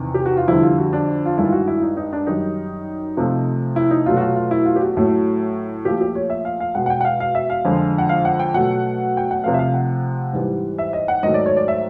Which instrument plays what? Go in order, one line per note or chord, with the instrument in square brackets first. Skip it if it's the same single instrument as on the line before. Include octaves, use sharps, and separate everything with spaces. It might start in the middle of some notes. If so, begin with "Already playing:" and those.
Already playing: [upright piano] E2 C3 D#3
G4
F#4
F4
F2 D3 G3 E4
F4
F#4
D4
F4
G2 D#3 G#3 E4
F4
F#4
E4
D#4
D#4
D4
F#2 D#3 G3 D#4
C3 F3 A3
E4
D#4
B2 F#3 A3 F4
F#4
F4
F4
E4
F4
G4
F#4
A2 F#3 A3
A#2 F3 A3 G4
G4
C#5
E5
F5
F5
B2 G#3 F#5
F#5
G5
F#5
F5
F5
E5
F5
F2 D3 F3 G#3
F#5
F5
F#5
G5
B2 F#3 A3 F#5
G5
F#5
C3 F3 A3 F5
E5
F5
F#5
G#2 E3 G3
E5
D#5
F#5
G#2 D#3 F#3 A3 D#5
D5
C#5
D5
E5